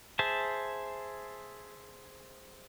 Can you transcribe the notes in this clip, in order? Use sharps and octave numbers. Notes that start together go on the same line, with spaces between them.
G#4 C5 E5 A5